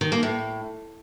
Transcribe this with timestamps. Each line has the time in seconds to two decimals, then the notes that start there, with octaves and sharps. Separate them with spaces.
0.01 D#3
0.12 A#3
0.23 A2